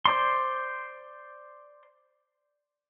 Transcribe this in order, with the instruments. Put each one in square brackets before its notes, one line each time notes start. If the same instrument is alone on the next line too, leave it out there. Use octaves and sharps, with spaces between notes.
[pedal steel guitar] C5 D5 C6